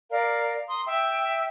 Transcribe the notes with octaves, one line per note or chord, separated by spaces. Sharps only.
A#4 D5 F5 A#5
A#5 C6 D#6
E5 G5 E6